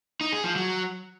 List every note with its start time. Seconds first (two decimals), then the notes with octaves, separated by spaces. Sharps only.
0.21 D#4
0.32 G#4
0.44 F3
0.56 F#3